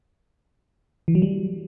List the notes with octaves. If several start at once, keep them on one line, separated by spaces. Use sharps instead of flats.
E3
F#3
G3